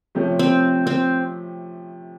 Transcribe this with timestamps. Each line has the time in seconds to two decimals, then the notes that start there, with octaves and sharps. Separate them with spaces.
0.15 C3 F3 A3 C#4
0.39 C4
0.87 C4